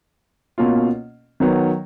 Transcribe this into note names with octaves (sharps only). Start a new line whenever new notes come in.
B2 A#3 C#4 F4
D#3 F#3 B3